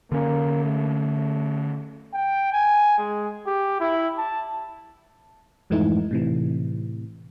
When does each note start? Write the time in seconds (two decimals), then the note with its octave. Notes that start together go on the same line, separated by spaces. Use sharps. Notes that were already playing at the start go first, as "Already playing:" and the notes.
0.12 D3 A#3 C#4
0.64 A3
2.14 G5
2.52 G#5
2.98 G#3
3.46 G4
3.80 E4
4.17 A5
5.70 F2 G#2 E3 A3 D#4 E4
6.11 A2 C3 E3